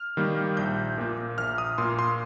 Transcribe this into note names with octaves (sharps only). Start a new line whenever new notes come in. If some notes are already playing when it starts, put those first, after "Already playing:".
Already playing: F6
D#3 G3 A#3
A#1 G6
A#2 A#3
A#1 F6
D#6
A#2 A#3 C6
C6